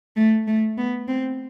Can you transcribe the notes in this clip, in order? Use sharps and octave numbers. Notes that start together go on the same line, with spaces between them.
A3
A3
B3
C4